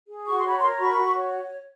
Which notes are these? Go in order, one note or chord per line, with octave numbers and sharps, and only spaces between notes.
G#4
F#4 C#6
C6
C#5 B5
A#5 C6
A#4
F#4 B5 C#6
F#4
C#5